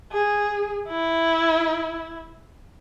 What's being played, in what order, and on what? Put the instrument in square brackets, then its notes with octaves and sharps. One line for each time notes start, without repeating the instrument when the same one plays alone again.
[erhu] G#4
E4